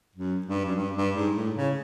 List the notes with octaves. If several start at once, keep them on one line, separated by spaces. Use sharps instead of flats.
F#2
G2
F#2
G2
G2
G#2
A2
C#3